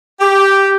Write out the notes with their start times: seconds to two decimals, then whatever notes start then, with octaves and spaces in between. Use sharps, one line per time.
0.21 G4